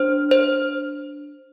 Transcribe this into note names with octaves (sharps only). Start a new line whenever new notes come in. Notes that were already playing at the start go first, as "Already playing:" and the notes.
Already playing: D4 C5
C5